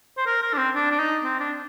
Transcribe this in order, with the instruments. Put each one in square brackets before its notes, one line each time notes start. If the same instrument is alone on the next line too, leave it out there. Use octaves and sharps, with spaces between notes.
[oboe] C5
A#4
A#4
D4
C4
D4
D4
D#4
C4
D4